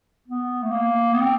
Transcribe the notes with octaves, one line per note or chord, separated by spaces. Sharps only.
B3
A3
A#3
B3
C4